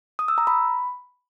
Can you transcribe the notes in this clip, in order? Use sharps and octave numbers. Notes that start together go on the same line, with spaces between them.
D#6
E6
A#5
B5